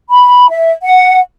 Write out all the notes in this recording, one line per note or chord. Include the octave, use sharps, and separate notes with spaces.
B5
E5
F#5